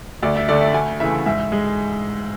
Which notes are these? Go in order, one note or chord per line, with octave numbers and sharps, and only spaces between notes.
D2 D5
E5
D3 A3 D5
E5
D2 G#5
C#3 E3 A3 E5
G#2 E5
G#3